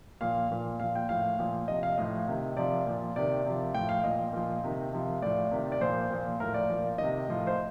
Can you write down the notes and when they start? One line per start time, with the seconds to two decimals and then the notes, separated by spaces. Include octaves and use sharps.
0.21 A#2 F3 F5
0.51 A#2 F3
0.80 A#2 F3 F5
0.95 G5
1.09 A2 F3 F5
1.39 A#2 F3
1.68 C3 F3 D#5
1.83 F5
1.98 A2 F3 D#5
2.28 C3 D#3
2.56 C3 F3 D5
2.86 A#2 F3
3.16 C3 D#3 D5
3.45 C3 F3
3.74 A2 F3 G5
3.89 F5
4.04 A#2 F3 D#5
4.33 A#2 F3
4.63 C3 D#3
4.93 C3 F3
5.22 A2 F3 D5
5.51 C3 D#3
5.72 D5
5.80 A#2 F3 C5
6.10 A#2 F3
6.40 A2 F3 A#4
6.54 D5
6.70 A#2 F3
6.98 D#3 D#5
7.03 C3
7.28 A2 F3
7.47 C5